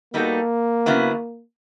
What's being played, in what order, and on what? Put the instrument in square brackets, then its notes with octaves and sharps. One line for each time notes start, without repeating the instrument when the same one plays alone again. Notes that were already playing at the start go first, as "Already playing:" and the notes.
[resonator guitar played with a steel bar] G3 B3 D#4 F#4 A4 [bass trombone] A#3
[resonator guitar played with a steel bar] C#3 F#3 B3 E4